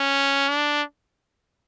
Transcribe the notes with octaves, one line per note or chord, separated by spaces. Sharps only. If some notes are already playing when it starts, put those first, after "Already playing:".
Already playing: C#4
D4